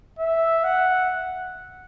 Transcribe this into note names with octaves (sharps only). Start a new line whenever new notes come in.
E5
F#5